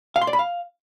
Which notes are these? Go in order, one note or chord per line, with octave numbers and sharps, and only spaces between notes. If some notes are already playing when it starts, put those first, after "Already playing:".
F5
C6
D5
B5
F5